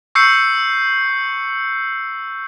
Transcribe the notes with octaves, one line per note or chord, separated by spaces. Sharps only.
C#6 E6 G6 C7 C#7